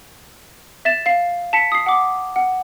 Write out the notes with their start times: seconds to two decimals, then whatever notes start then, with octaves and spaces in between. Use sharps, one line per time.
0.85 E5 A6 E7
1.06 F5 C7
1.53 A5 B6 C#7
1.72 D#6 C7
1.86 F#5 D6
2.36 F#5